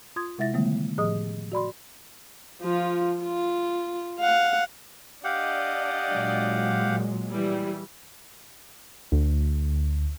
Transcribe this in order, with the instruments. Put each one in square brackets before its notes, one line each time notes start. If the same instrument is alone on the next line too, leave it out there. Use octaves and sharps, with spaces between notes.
[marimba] F4 C6 D#6 G#6
C3 G#3 E4 E5 A6 A#6
D3 D#3 G3 A3 B3
A2 F3 G#4 D#5 D#6
F#4 D5 B5 C6
[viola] F3 F4
F4
F5 F#5
[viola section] D4 D5 D#5 [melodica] G4 F5 F#5
[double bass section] A#2 F#3 G#3
[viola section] E3 G3
[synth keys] D2